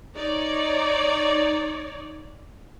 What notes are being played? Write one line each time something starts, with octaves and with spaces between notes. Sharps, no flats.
D#4 C#5 D5